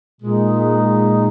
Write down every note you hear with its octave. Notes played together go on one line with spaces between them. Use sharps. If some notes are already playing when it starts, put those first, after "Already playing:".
A#2 G#3 D#4